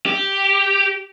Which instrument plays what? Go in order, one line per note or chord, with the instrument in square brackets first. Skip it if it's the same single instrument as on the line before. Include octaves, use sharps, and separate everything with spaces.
[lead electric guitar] G4